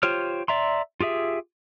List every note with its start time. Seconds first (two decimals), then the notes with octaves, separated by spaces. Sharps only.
0.03 F4 G4 C5 C#5 F6
0.48 D5 E5 A#5 C6
1.00 F4 G4 G#4 E5